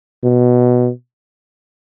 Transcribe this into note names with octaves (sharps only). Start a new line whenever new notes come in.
B2